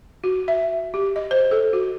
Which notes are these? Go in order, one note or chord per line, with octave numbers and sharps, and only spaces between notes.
F#4
E5
G4
D#5
C5
A4
F#4